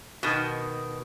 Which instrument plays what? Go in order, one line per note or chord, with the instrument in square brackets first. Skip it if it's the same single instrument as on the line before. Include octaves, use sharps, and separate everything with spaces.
[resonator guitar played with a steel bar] B2 D#3